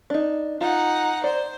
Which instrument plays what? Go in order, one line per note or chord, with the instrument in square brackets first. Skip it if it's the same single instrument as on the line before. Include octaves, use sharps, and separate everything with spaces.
[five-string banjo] D4 D#4
[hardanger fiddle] D#4 F#5 [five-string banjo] F4
[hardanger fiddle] C5 [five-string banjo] D5